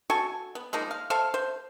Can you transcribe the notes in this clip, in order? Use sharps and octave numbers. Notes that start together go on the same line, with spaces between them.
F#4 A4 G#5 C#6
B3
F3 G#3 A#3 D#4
F5
A4 C5 E5 F5
C5